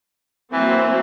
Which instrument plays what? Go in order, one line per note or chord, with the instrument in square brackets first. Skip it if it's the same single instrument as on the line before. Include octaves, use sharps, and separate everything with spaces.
[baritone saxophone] E3 [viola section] F#3 A#3 C4